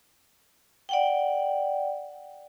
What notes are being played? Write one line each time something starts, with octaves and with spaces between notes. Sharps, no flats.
D5 F#5 G5